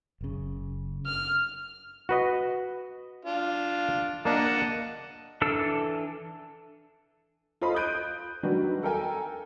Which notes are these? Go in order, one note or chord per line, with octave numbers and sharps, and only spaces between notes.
F#1 C#3
F6
F#4 B4 D#5
D4 F4
A#3 D4 D#5 F#5 A5
E3 D4 A4 E6
F4 A4 C5 D#5 B5 C6
D#6 F#6 G6 D7 D#7
D#3 F#3 G3 D4 F#4 B4
A4 A#4 G5 G#5